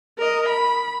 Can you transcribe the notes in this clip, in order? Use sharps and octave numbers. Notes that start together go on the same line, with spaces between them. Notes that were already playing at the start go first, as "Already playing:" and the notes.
A#4 D#5
B5